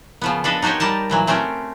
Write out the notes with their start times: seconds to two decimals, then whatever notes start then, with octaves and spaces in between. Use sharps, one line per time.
0.22 C#3 F3 B3
0.44 D4 A4 B4 D#5
0.62 D#4 F#4 G4 C5 C#5
0.80 G3 G4 A#4 A5
1.10 A#2 E3 F#3
1.27 A3 C4 C#4 F#4 G4 A#4